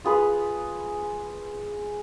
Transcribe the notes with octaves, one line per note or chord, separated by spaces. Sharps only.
F4 G#4 B4 F5